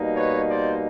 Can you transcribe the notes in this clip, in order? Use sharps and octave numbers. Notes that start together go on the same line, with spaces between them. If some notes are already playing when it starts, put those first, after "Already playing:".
Already playing: B2 G3 A#3 D#4
B4 C#5
C5 D5